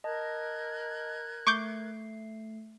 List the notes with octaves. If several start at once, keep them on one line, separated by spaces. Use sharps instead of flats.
A#4 D#5 A5 F#6 G#6
A3 C#6 D6 G6 C7